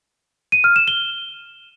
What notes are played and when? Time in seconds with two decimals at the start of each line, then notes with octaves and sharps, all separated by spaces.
0.52 D#7
0.64 F6
0.76 E7
0.88 G7